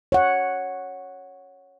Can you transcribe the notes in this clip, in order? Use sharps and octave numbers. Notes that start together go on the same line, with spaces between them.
C#5 F#5